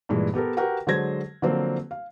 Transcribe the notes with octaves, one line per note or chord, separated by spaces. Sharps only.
G2 A#2 E3 G#3
B3 G4 A4 A#4
F#4 G4 A#4 B4 F#5 G5
D3 F#3 G#3 C5 G#6 A#6
D3 F3 F#3 A#3 C4
F5